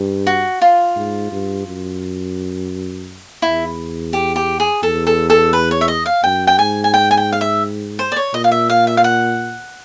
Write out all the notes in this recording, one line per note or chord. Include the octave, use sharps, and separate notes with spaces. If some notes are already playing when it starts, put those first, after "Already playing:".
Already playing: G2
F#4
F4
G#2
G2
F#2
E2 E4
G4
G4
G#4
E2 A4
A4
A4
B4
C#5
E5
D#5
F5
F#2 G5
G5
G#2 G#5
G#5
G5
G#5
G5
F5
E5
C5
D5
C#5
A#2 D#5
F5
E5
F5
E5
F5
F#5